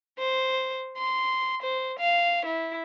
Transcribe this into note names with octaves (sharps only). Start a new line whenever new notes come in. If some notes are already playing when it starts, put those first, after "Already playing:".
C5
C6
C5
F5
E4